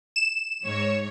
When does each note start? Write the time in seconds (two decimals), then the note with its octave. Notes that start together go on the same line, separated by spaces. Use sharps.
0.16 E7
0.63 G#2 C#5